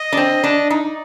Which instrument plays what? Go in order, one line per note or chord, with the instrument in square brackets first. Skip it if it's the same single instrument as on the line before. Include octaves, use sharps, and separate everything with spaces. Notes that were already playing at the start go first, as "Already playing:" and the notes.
Already playing: [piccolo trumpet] D#5
[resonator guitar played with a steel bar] D4
C4
D4
[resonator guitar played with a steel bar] D#4 [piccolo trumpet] D5